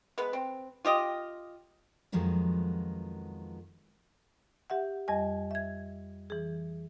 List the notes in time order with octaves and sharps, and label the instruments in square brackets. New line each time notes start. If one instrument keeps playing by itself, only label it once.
[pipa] G#3 B3 B4
C4
F4 G4 D#5
[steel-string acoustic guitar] F2 D#3 F3 F#3 G#3 B3
[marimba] G4 E5 F#5
F2 G3 D#5 G#5
E5 G#6
E3 G#4